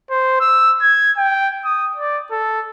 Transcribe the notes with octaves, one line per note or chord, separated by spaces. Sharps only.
C5
E6
G#6
G5
D#6
D5
A4